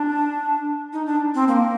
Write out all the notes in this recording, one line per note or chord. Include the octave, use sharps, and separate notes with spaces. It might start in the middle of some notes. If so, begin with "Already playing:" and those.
Already playing: D4
D#4
D4
C4
A#3